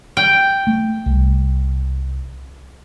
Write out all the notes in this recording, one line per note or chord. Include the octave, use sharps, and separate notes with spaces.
G5
A3
C2